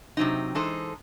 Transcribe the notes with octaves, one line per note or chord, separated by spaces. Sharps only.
C3 F#3 C4 D#4
E3 G#3 D#4 A4 C5